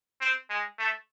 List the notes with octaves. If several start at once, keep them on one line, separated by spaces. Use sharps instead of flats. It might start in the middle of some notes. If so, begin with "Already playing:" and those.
C4
G#3
A3